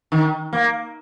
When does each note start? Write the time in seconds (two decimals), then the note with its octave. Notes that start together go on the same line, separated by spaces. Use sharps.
0.12 D#3
0.53 A#3